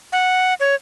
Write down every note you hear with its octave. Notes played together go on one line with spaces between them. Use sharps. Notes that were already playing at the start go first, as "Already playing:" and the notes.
F#5
C#5